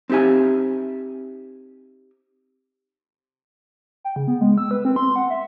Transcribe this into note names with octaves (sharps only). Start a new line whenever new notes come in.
C4 D#4 G4 E5 G#5
G5
C#3
B3
G#3
E6
B4
C4
C6
F#5
E5